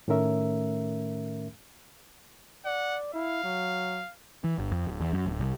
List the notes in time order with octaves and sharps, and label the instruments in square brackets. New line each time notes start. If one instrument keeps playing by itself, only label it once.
[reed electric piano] A2 D#3 A3 C#4 A#4 E5
[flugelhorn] D5 [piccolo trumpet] F#5
[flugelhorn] E4 [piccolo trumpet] F5
[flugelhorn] F#3
[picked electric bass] E3
G1
F2
D1
E2
F#2
D1
C2